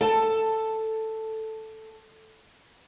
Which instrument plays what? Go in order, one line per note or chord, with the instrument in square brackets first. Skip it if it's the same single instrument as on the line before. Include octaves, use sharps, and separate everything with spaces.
[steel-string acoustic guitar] A4 A5